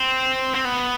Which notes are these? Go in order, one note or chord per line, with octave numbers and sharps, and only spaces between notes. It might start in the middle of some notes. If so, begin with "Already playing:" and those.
Already playing: C4
C4
B3